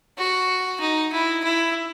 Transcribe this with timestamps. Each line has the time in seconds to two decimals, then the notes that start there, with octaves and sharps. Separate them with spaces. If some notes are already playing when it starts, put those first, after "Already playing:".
0.18 F#4
0.80 D#4
1.12 E4
1.44 E4